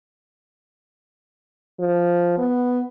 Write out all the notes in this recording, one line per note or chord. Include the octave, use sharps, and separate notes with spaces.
F3
B3